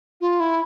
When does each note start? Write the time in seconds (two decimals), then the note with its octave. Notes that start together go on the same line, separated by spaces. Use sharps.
0.21 F4
0.40 E4